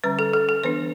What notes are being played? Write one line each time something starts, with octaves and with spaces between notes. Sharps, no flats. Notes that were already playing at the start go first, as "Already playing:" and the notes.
D3 G3 C#4 B4
A4
A4
A4
E3 B3 D4 B4